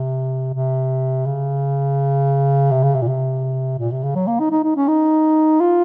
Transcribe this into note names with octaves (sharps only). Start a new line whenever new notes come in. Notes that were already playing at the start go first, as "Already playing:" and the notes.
Already playing: C3
C3
C#3
C3
C#3
C3
A#2
C3
A#2
C3
C#3
F#3
A#3
D#4
D#4
D#4
C#4
D#4
F4